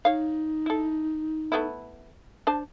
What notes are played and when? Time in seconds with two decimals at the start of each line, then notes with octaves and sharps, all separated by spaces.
0.05 D#4 C#5 F5
0.66 E4 A4
1.52 A3 B3 E4
2.47 D4 C5 A5